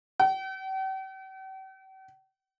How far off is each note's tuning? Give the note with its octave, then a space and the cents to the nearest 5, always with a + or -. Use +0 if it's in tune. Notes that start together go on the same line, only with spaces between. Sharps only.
G5 -45